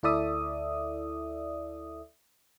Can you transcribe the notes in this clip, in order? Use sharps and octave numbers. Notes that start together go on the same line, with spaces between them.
D2 E4 A4 D5 E5 D#6